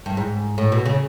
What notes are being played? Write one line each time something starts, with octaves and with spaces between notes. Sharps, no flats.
G2
G#2
A2
B2
C#3